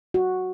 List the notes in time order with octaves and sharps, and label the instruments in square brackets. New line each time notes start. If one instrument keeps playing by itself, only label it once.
[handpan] F#4